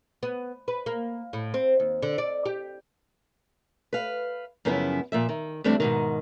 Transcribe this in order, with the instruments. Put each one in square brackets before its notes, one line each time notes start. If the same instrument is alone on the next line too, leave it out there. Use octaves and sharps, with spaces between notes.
[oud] B3
B4
A#3
A2
C4
D#2
D3
D5
G4
[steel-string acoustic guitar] B4 F5
F#2 C#3 F3 B3 E4
A#2 F3 E5
D#3
E2 G3 A3 C4 D4
G#2 B2 D#3